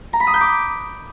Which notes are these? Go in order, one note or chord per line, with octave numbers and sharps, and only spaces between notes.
A#5
B5
D#6
G6
D6